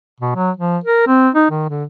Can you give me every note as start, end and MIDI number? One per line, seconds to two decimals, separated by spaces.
0.20 0.34 47
0.36 0.51 54
0.57 0.78 53
0.84 1.03 70
1.07 1.29 60
1.35 1.46 63
1.51 1.68 51
1.69 1.85 50